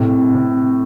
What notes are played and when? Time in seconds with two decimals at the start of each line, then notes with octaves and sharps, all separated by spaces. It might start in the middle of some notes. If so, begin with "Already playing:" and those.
Already playing: A2 C3
0.35 C3